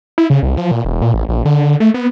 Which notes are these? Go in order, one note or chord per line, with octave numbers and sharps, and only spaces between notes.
E4
C#3
C2
F3
A#2
E1
A#2
A1
A#1
D3
A3
B3